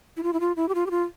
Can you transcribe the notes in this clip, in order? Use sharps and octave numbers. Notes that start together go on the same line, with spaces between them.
E4
F4
E4
F4
E4
G4
F4
G4
F4